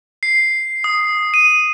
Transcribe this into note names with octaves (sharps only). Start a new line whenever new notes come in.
C7
D#6
D#7